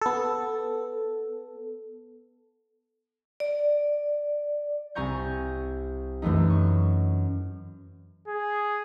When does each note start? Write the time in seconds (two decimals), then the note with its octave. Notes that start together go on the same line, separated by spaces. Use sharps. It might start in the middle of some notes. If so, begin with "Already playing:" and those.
0.01 B3 A4
3.40 D5
4.95 C2 G#5 A#5 C#6 G6
6.22 F#2 E3 F#3 A3 D#4
6.50 C#6
8.28 G#4